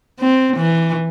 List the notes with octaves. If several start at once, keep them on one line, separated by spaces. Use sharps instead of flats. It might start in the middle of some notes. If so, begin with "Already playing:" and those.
C4
E3